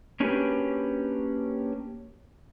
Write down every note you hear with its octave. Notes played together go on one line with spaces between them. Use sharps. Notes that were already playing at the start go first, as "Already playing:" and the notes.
A#3 C#4 D4 F#4 G4 B4